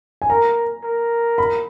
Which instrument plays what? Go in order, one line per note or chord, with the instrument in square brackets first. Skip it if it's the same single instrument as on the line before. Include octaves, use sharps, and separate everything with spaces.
[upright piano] G#5
[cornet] A#4 [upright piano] A#5
[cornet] A#4
[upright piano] B5